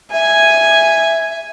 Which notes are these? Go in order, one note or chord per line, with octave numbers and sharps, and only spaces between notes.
E5 G#5